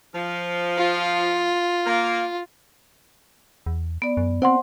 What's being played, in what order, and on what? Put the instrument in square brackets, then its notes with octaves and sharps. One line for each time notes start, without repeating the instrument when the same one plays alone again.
[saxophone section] F3
[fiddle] F4
[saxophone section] A#3
[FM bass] E2
[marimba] B3 D5
[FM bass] F#2
[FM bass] C4 [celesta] C5 F#5 C6